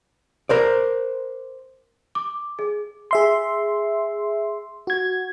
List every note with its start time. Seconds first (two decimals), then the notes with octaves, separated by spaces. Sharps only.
0.49 A#4 C5 D5
2.15 D6
2.59 G#4
3.11 G#4 E5 C6
4.87 F#4 G#6